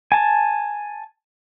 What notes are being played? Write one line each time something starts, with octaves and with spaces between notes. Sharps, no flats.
G#5 A5